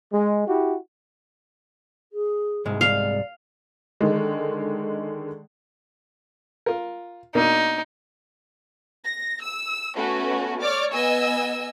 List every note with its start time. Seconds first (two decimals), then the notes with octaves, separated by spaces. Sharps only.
0.13 G#3
0.48 E4 F#4 G4
2.12 G#4
2.65 C2 G#2 G#3
2.81 D5 F5
4.01 D3 D#3 G#3
6.66 F4 A#4
7.35 B2 A#3 D4 D#4
9.05 A#6
9.42 E6
9.95 A3 B3 C#4 F#4 B4
10.60 C#5 D5 D6 F6
10.92 B3 D#5 G#5 E6